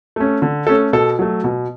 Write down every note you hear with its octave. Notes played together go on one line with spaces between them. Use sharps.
A3 C#4
D3
A3 C#4 A4
B2 A4
F#3 A3
B2